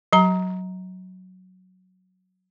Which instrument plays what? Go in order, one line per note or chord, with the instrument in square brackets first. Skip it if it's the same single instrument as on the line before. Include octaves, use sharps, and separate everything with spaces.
[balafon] F#3 A#5